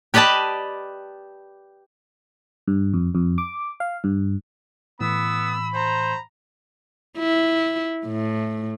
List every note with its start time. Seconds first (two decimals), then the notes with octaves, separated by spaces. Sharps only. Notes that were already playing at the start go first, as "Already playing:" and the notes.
0.14 G4 B4 D5 D#5 A5
2.68 G2
2.94 F2
3.15 F2
3.38 D6
3.80 F5
4.04 G2
5.01 A2 E3 B3 B5 E6
5.74 C5 A#5
7.18 E4
8.05 A2